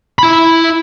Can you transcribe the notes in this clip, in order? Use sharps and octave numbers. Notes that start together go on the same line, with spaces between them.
E4 B5